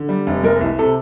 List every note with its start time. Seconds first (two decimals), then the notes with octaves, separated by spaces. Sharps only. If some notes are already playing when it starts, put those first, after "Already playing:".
Already playing: D3
0.09 G3
0.27 F1
0.43 G#3 A#4
0.61 C2
0.79 C3 A4